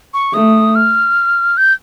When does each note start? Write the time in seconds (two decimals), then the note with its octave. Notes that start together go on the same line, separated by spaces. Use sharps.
0.14 C#6
0.33 A3 D#6
0.75 F6
1.57 G6